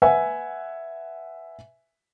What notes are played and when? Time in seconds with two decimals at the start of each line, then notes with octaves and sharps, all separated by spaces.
0.02 B4 E5 F#5 G#5